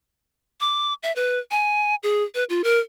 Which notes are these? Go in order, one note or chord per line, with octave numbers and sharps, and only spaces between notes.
D6
E5
B4
G#5
G#4
B4
F4
A#4